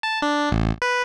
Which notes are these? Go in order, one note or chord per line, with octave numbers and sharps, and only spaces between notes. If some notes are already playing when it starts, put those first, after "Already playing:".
A5
D4
A1
B4